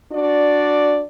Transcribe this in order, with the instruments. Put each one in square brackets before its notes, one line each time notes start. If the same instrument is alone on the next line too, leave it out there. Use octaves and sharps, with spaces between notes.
[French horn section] D4 F#4 D5